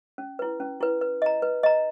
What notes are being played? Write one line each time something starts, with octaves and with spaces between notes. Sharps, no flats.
C#4
E4 B4
C#4
E4 B4
B4
D#5 A#5
B4
D#5 A#5